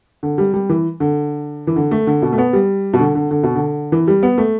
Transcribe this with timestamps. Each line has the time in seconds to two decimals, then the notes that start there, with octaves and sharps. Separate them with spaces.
0.23 D3
0.38 G3
0.54 G3
0.69 E3
1.00 D3
1.67 E3
1.76 D3
1.91 A3
2.07 D3
2.22 B2
2.32 A3
2.38 B3
2.53 G3
2.93 B2
2.99 D3
3.15 D3
3.31 D3
3.43 B2
3.55 D3
3.92 E3
4.07 G3
4.23 B3
4.38 A3